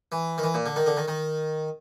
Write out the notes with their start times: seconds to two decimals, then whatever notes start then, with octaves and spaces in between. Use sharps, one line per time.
0.12 E3
0.38 D#3
0.43 E3
0.54 A#2
0.66 D3
0.76 D#3
0.86 D3
0.97 D#3
1.08 D#3